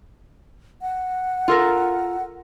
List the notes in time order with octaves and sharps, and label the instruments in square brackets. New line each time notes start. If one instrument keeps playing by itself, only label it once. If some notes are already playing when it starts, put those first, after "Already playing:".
[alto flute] F#5
[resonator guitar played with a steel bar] F4 A4 A#4